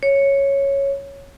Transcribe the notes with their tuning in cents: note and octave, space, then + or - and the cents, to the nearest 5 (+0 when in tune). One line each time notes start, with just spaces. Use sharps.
C#5 -5